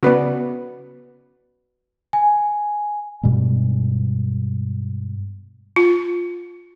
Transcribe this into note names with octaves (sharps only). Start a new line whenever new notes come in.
C#3 B3 F#4 B4 D5
G#5
G2 B2 G3 G#3
F4